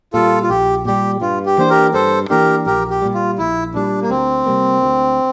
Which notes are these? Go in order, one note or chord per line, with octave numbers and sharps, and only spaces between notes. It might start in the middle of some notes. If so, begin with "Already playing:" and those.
A#2 G3 F4 A4
F4
A#1 G4
A#2 G3 G4
G2 F4
G4
E3 A#3 D4 C5
G4 A#4
G2 A4 C5
E3 A#3 D4 G4 A#4
A#1 G4 A#4
G4
A#2 G3
F4
A#1 E4
A#2 G3 D4
A#3
D2 C4
C3 G3 A#3
D2